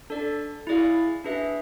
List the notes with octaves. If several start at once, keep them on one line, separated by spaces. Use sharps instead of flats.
D4 A4 D5
E4 G#4 D5 F5
D4 G#4 B4 E5